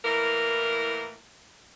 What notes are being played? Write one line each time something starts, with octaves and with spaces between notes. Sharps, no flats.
A2 E3 A#3 A#4